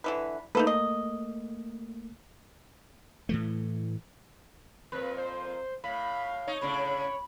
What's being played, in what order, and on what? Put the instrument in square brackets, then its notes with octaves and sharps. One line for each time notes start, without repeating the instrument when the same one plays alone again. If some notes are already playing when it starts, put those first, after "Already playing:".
[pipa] D3 E3 B4
[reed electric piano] A3 A#3 [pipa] D#4 A4 B4
[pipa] D#5
[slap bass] A2 E3 A3
[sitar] F2 A#2 [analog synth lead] B4
[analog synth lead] C5
[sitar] A2 [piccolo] F5 [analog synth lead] B5
[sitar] D#4 [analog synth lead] C#5
[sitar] A2 C#3 D4 [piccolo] B5